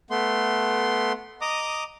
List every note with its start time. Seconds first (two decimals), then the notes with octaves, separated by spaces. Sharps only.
0.10 A3 B3 C6
1.41 D#5 A#5 D6 D#6